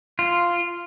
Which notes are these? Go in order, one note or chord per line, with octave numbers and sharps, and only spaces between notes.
F4